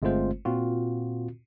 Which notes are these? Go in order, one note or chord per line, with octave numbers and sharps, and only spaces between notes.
G1 G#3 A3 C4 F4 C5
A#2 C4 F4 F#4